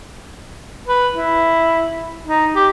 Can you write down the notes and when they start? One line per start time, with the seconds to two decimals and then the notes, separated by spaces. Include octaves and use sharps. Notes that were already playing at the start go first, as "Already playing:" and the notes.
0.87 B4
1.15 E4
2.26 D#4
2.55 G4